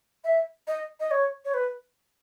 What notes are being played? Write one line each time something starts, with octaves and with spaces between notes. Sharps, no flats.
E5
D#5
D#5
C#5
C#5
B4